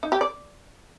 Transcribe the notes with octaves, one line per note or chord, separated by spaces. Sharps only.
D#4
G4
D5